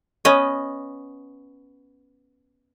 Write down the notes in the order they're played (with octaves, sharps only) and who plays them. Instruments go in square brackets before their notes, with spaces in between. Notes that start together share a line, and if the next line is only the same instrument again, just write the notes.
[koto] B3 C#4 D#5